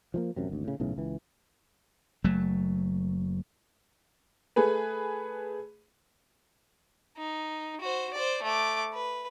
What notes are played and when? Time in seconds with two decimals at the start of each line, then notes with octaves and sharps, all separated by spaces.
0.14 F3 G#3 A#3
0.36 A1 F#2 C3
0.49 G#1 D2
0.64 A2 C#3
0.80 B1 A2 C#3 E3
0.96 C#2 E3
2.24 F#1 F#3 A3
4.56 A3 G#4 B4
7.17 D#4
7.81 F#4 C5
8.13 C5 D5
8.43 A3 D6
8.94 B4